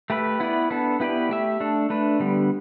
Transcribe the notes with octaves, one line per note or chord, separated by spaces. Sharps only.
A3 G4 B4 E5
B3 E4 B4 D5
B3 D4 A4
B3 E4 G4 B4 D5
A3 G4 E5
A3 D4 A4
A3 D4 B4
D3 G3 B3